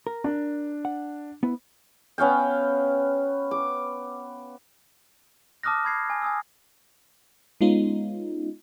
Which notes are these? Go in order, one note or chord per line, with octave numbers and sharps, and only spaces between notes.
A#4
D4
F#5
B3 E4
B3 C#4 F5 G5
D6
A5 D6 D#6 F6 F#6 A#6
B5 G#6 C7
G#5
G#5 D#6 E6
G#3 B3 C#4 D#4 F4